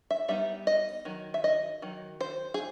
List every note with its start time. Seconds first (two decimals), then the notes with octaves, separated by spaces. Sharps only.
0.11 E5
0.28 G3 B3 D#4 E5
0.67 D#5
1.05 D#3 F#3
1.34 E5
1.44 D#5
1.82 D#3 F#3
2.21 C5
2.54 G#4